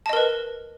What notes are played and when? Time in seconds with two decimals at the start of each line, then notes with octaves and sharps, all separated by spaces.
0.06 A5
0.09 D#5
0.13 A#4
0.17 B4